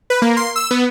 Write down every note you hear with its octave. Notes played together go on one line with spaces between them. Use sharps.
B4
A#3
C6
E6
B3